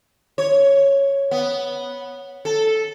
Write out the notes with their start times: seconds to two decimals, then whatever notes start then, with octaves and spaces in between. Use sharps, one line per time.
0.38 C#5
1.31 B3
2.45 A4